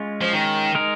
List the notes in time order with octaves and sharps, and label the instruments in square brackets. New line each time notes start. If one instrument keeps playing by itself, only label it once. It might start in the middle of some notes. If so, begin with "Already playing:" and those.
Already playing: [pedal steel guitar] G#3 C#4 F4
[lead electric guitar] F3
D#3
[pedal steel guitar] G#3 D#4 A#4